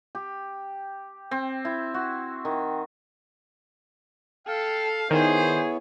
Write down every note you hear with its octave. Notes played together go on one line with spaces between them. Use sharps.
G4
C4
E4
F#4
D#3
A4 F5 G5
D#3 B3 E4 G#4 C5 C#5